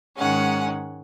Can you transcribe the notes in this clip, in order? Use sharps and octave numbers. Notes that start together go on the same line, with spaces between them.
G#2 D#3 G#3 C#4 F#5